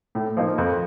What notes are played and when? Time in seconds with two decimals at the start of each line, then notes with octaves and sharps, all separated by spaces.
0.15 A2
0.37 F3 A#3 D#4
0.58 F2